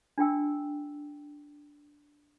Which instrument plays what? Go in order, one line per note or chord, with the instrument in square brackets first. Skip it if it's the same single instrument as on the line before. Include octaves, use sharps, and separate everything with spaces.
[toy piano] D4 F4 G5 E6